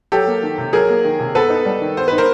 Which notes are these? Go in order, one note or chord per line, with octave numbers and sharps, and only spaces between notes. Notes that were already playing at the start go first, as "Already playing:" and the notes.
F#3 G4 A4
A#3
D#3
C3
F#3 G#4 A#4
A#3
D#3
C3
B3 A4 B4
D#4
G3
D#3
B3 C5
D#4 B4
A#4 C5